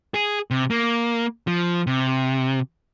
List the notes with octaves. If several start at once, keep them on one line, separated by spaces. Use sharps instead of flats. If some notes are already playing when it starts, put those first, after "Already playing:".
G#4
C3
A#3
F3
C3